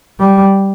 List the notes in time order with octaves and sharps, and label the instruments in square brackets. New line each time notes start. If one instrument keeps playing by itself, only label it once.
[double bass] G3